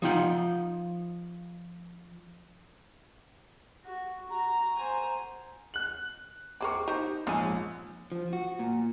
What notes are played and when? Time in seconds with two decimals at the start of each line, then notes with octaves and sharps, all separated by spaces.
0.02 F3 D#4 F4 F#5 G5
3.85 F#4
4.30 F#4 A#5
4.76 C5 G#5
5.74 F#6 F#7
6.61 C4 G#4 A#4 C#6 D6
6.88 D#4 G4 C5
7.27 A#1 G#2 C#4 G#5
8.12 F3
8.33 F#4
8.59 A#2